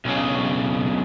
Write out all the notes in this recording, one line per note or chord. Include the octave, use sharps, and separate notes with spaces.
B1 C#3